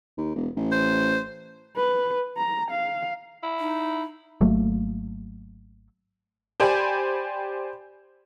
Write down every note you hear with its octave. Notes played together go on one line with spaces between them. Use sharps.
D#2
E1
A1
C5
B4
A#5
F5
E4
D#4
G#1 F#3 A3 A#3
G4 C5 D5 G5 G#5 B5